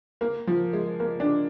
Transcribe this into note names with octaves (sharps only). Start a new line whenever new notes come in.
A#3
F3
G#3
A#3
D4